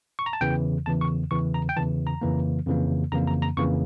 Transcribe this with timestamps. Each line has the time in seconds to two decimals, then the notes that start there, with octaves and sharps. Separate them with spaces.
0.19 C#6
0.26 A#5
0.33 A5
0.41 E2 C#3 E3 G5
0.86 E2 C#3 E3 A5
1.01 C#6
1.31 E2 C#3 E3 C#6
1.54 A#5
1.69 G5
1.76 E2 C#3 E3 A5
2.07 A#5
2.22 F2 C#3 E3 A#3
2.67 F2 C#3 E3 A#3
3.12 F2 C#3 E3 A#3 A#5
3.27 A#5
3.42 A#5
3.57 F2 C#3 E3 A#3 C#6